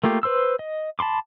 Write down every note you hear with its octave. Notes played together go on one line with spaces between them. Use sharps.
A3 A#3 F4 G4
B4 C5 C6 E6
D#5
A5 B5 C6 D6